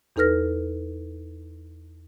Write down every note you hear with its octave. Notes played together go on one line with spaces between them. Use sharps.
E2 D#4 A4 B4 F6 A#6